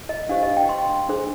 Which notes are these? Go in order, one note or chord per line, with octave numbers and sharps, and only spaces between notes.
D#5
D4 G4 C5 F5
D#5
G5
C6
D4 G#4 C5